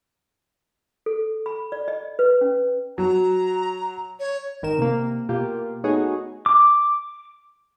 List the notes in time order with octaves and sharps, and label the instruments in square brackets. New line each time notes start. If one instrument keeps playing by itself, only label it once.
[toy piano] A4
B5
D5
D#5
B4
C#4
[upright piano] F#3 [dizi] A#5
[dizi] C#5
[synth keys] G#1 D#3 A#4 E7
C3 A#3
B2 A#3 F4 G4
A3 B3 D#4 F#4 G#4 C#5
[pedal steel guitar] D6